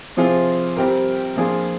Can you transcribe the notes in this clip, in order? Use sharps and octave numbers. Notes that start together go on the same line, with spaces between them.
C3 F3 C4 F4 G#4
G3 C4 G4 A#4
F3 A#3 D4 F4 G#4